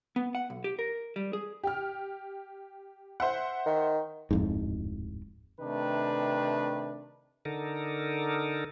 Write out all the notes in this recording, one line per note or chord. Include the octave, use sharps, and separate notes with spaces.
B3
F#5
B1
G4
A#4
G3
G#4
G4 F6
C5 E5 F#5
D#3
D1 F2 G#2
C3 D#3 A3 D4 B4
D3 D#4 A4 A#4